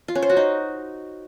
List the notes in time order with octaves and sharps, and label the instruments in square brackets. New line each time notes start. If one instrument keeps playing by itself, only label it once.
[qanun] F4
C#4
C5
F#4
D#4